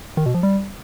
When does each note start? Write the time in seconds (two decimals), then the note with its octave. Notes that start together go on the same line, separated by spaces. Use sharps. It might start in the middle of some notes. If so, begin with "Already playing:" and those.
0.17 D#3
0.26 B2
0.35 F3
0.43 G3